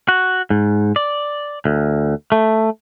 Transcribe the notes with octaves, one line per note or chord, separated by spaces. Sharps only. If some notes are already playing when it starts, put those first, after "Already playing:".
F#4
G#2
D5
D2
A3